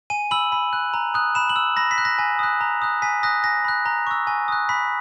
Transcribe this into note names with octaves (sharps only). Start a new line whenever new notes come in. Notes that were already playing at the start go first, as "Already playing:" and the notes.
G#5 D#7
B5 E6 F#7
B5
F#6
A#5
D#6 F#6
B5 E7
F#7
E6
B5 A#6
B6
F#6
A#6
G#5
D#6 F#6
A#5
D#6 F#6
G#5 B6
D#6 F#6 A#6
G#5 A#6
B5 F#6
A#5
C#6 E6
G#5
D#6 F#6
B5 B6